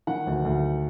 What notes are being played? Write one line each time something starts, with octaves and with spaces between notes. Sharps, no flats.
D#3 F#5
D2
D2